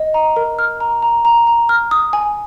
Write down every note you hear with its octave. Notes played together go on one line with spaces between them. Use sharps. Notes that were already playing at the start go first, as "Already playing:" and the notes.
Already playing: D#5
A#5
A#4
F6
A#5
A#5
A#5
A#5
F6
D#6
G#5